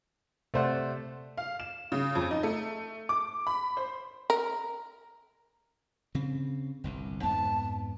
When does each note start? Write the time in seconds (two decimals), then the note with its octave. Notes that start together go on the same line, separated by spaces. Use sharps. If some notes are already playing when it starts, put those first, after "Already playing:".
0.54 C3 A3 C5 D5 F#5
1.38 F5
1.60 E7
1.92 C#3
2.15 F2
2.31 D#4
2.43 A3
3.09 D6
3.47 B5
3.77 C5
4.30 A#4
6.15 C#3 C4
6.84 G1 C2 G2
7.23 F2 G#2 B3 A5